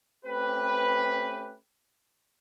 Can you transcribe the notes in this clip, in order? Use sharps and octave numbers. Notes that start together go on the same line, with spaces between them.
A3 C4 C#4 G4 B4